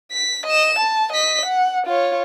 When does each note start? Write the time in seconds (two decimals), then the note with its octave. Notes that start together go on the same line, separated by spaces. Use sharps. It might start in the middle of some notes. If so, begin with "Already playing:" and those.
0.12 B6
0.46 D#5 E7
0.78 A5
1.12 D#5 B6
1.45 F#5
1.86 F4 C#5